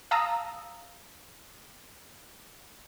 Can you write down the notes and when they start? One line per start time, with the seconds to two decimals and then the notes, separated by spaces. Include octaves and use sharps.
0.11 F5 A5 A#5 D#6 E6